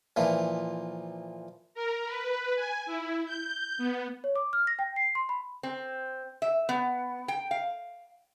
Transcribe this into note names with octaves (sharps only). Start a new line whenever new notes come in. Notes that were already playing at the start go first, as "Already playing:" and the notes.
A#2 E3 F3
A#4
B4
G#5
E4
G6
B3
C#5
D6
F6
A#6
G5
C7
C6
B5
C4
E5
B3
G5
F5